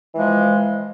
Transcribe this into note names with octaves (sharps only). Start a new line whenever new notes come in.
E3 F3 G#3